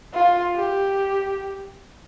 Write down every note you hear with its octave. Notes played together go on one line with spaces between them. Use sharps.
F4
G4